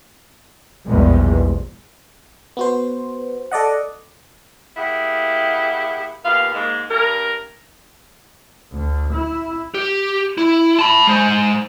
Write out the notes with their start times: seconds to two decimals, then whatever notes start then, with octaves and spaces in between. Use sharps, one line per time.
0.87 A#1 E2 G#2 B2 G3 G#3
2.57 B3 F#4 C5
3.52 A4 D5 D#5 F#5
4.76 A#3 E4 G4 G#4 F#5
6.24 D#2 A#2 B3 F5
6.53 G#2 G#3 A#3
6.90 G2 A#4
8.73 D2
9.13 E4
9.74 G4
10.38 E4
10.79 A5 B5
11.07 G#3 C5